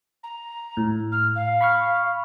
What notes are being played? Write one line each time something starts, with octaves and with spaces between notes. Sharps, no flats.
A#5
A2
F6
F5
B5 C#6 F6